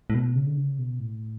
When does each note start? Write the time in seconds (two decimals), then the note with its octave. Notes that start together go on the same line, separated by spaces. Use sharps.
0.10 A2
0.14 B2
0.36 C#3
0.46 D3
0.57 C#3
0.78 B2
0.99 A2